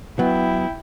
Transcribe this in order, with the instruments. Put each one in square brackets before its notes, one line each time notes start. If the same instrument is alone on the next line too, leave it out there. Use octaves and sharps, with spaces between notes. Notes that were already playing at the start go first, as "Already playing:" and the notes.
[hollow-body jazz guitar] F#3 [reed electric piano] B3 [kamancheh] E4 G5